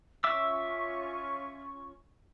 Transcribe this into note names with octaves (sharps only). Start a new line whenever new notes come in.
C#4 F4 E5 C#6 D6 E6